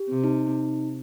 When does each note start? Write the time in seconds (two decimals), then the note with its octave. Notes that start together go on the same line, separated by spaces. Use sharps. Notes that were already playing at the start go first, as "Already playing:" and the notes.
Already playing: G4
0.09 C3
0.24 D#4